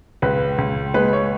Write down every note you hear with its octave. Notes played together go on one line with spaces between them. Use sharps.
C#2 B4
C#2
G#3 B4
C#5